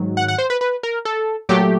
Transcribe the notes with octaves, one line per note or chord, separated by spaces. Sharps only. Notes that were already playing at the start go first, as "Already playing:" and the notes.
Already playing: G#2 D#3 F#3
F#5
F#5
C5
B4
B4
A#4
A4
A#2 F#3 A3 G4